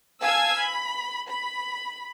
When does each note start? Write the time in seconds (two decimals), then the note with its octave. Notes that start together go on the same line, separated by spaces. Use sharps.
0.22 F5 G#5 A5 E6 G#6
0.59 B5
1.28 B5